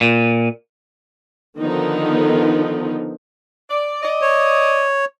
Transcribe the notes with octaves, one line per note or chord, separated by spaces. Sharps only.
A#2
D3 D#3 F3 B3 D#4
D5
D5 D#5
C#5